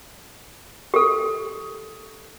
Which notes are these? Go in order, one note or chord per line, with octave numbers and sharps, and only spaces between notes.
G4 A4